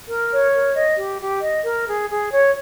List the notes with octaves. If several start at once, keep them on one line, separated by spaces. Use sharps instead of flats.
A#4
C#5
A#4
D#5
G4
G4
D#5
A#4
G#4
G#4
C#5